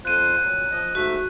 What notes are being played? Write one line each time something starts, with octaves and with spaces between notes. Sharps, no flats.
F2 F4 C5 F#6 D#7
A#2 F#3
F3 D#5
G#2 A3 F#4 E5